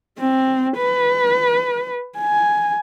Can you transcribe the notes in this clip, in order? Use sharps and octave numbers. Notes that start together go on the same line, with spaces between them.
C4
B4
G#5